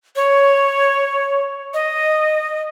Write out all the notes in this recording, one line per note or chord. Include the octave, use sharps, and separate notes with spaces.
C#5
D#5